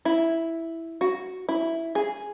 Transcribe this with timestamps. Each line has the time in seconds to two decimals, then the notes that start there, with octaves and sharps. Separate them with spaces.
0.05 E4
1.01 F#4
1.49 E4
1.95 G#4